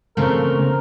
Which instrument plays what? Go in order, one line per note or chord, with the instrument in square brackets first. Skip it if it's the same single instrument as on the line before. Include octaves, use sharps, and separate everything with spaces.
[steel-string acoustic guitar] C#3 A3 C4 [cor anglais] A#4